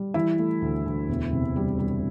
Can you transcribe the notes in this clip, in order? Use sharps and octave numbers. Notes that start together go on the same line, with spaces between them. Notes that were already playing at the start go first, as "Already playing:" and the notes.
Already playing: G3
E3 E4
A3
D2
D2
E1
C3
G3
G3